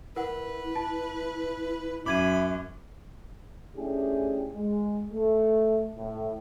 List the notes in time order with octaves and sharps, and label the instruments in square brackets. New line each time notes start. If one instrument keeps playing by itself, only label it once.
[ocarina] E4 [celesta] A#4 F#5 [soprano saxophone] B4
[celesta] A5
[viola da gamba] F#2 [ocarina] E5 [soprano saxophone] B5 [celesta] D6 G#6 D#7
[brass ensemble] A3 C#4 D4 E4 G4 G#4
G#3
A3
A2